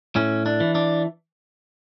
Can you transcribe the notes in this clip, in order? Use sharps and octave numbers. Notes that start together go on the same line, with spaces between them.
A2 C#4
D4
E3
D4